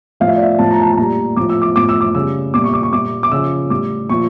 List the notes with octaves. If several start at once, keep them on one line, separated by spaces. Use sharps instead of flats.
A2 F3 F5
E5
D5
E5
A2 F3 A5
A#5
A5
A5
A#2 G3 A#5
A2 F3 D6
E6
D6
A2 F3 D6
E6
D6
C#3 G3 E6
A#2 G3 D6
C#6
D6
C#6
A#2 G3 D6
D6
C#3 F3 E6
A2 G3 D6
A#2 F3 C#6